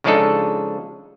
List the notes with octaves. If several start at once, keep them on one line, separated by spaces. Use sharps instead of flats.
C#3 F3 G#3 D4 D#4 A4